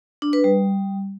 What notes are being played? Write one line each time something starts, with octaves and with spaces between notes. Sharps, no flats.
D4
B4
G3